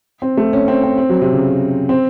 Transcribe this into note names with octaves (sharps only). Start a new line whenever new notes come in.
C4
A3
C#4
C4
C4
C4
F#3
C3
C#3
C4